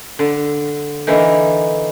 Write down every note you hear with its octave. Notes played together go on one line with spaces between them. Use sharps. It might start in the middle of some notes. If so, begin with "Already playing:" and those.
D3
D3 E3 A#3 D#4